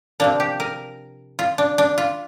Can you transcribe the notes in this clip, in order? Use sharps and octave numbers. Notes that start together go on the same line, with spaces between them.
C3 F3 A#3 D4
G4
A#4
F4
D4
D4
F4